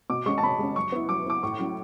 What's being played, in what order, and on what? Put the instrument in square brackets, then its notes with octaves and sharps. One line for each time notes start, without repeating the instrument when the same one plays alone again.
[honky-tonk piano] B2 [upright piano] D6
[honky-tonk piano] G#3 C#4 [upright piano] C#6
[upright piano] A5
[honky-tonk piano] B2 [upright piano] B5
[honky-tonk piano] G#3 C#4
[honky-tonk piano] F#3 [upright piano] C#6
[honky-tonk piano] B3 E4
[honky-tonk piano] F#3 [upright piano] D6
[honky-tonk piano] B3 E4 [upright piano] D6
[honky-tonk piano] A2 [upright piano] C#6
[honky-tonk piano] F#3 C#4